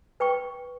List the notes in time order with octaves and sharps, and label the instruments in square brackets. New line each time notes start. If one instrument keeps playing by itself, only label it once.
[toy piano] B4 G5 C#6